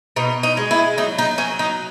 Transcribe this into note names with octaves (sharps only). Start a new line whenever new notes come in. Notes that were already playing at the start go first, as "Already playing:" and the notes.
B2 D#4
D#4
G#3
E4
F#3 D#4
D#4
F#3 C#4
D#4